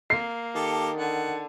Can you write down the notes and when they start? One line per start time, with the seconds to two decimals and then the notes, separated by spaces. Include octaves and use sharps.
0.10 A#3 C7
0.55 D#3 G4 A4
0.97 D3 F#5